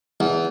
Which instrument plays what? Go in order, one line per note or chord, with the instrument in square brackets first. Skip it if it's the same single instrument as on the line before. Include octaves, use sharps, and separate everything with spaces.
[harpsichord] E2